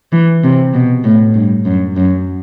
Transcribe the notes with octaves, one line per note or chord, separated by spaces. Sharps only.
E3
C3
B2
A2
G2
F#2
F#2